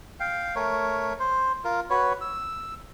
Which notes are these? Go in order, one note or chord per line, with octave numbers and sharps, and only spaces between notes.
F5 G5
A3 A#4 C#5
C5
F4 A#4
F#4 B4 C#5
E6